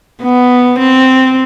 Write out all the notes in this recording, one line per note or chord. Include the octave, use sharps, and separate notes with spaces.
B3
C4